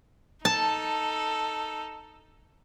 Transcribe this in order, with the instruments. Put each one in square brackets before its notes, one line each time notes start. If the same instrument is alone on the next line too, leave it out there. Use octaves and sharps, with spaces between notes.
[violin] D#4 A4 [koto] A5